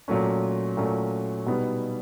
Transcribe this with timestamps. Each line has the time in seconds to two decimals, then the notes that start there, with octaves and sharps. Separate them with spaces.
0.08 A#2 F#3 A3 C#4
0.77 A#2 F#3 A3 C#4
1.46 B2 G3 B3 D#4